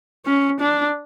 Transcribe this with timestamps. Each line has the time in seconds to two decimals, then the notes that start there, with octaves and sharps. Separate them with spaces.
0.26 C#4
0.61 D4